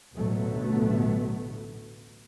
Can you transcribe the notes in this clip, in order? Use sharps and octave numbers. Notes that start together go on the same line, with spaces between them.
A1 D2 B2 F#3 A3 B3